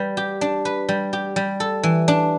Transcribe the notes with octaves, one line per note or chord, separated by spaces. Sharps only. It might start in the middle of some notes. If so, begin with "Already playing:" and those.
Already playing: G3 B4
G4
D4
B4
G3
G4
G3
A4
E3
D4